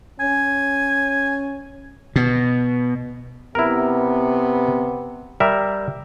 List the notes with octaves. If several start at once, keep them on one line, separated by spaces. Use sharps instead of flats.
C#4 G#5
B2
C3 B3 E4 A#4
G3 A#4 E5